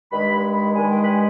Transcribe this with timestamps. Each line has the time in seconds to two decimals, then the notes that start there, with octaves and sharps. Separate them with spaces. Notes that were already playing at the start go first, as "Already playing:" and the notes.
0.12 G2 D#3 G#3 B5
0.33 B5
0.53 B5
0.74 G2 D#3 G#3 G#5
0.90 G5
1.03 B5
1.06 G#5